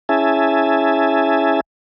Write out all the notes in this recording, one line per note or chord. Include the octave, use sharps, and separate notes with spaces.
C#4 E4 G#4 E5 G#5 A5